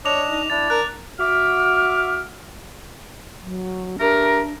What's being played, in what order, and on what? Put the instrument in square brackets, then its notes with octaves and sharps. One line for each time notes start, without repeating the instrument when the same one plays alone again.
[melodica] D4 D#5 [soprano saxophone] C#5 [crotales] D6 F7
[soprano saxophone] D#4
[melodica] D4 [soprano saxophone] E4 [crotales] A6
[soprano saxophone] A#4 [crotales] F#6
[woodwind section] F#4 E5 D6 F6
[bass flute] F#3
[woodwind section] A3 G4 A#4 [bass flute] D4